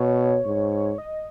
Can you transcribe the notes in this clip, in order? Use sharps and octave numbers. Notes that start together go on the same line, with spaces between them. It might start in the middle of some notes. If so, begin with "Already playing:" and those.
Already playing: B2 C#5
G#2
D#5